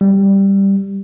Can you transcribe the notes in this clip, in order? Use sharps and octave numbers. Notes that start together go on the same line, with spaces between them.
G3